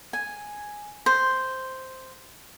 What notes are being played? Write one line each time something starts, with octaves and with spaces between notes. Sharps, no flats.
G#5
C5